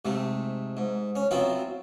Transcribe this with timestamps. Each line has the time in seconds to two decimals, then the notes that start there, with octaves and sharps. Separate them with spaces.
0.05 G#2 C3 A3
0.77 G#2
1.15 C#4
1.31 F#3 B3 C4 E4 F4